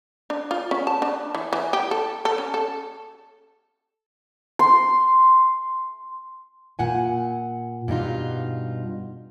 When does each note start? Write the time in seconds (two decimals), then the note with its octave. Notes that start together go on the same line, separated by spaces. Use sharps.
0.30 D4
0.51 F4
0.71 C#4
0.87 A5
1.02 D4
1.35 E3
1.53 E3
1.73 G4
1.91 A4
2.25 A4
2.38 C#4
2.54 A4
4.59 C6
6.79 A#2 F#5 G#5
7.88 G2 B2 D#4 F4